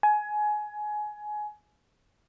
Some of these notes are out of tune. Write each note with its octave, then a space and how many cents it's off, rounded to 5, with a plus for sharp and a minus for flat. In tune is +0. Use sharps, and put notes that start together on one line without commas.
G#5 +20